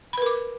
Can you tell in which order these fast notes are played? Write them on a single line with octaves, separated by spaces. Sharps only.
B5 B4 A#4 D6